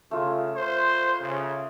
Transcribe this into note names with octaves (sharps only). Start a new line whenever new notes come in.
C#3 A3 F4
C5
C#3